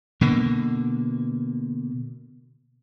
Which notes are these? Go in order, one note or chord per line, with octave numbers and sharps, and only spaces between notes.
B2 D3 A#3